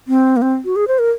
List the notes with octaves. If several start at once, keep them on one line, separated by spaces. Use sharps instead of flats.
C4
A#3
C4
F#4
G#4
C5
A#4